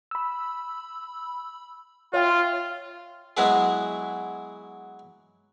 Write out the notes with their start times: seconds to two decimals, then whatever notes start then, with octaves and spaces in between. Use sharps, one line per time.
0.11 B5 E6
2.14 F4 C#5 E5 G5
3.37 F#3 G#3 B3 E4 G#4